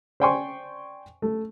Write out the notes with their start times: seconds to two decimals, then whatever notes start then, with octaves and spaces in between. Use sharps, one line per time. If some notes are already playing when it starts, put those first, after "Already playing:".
0.20 C5 D5 G5 G#5 C6 C#6
1.22 A3